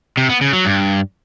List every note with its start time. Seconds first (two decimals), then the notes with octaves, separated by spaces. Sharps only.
0.17 C3
0.29 B3
0.41 C#3
0.53 F#3
0.65 G2